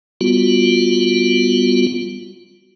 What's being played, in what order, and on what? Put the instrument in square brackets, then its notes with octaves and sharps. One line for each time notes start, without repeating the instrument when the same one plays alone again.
[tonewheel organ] G3 B3 F4 F#4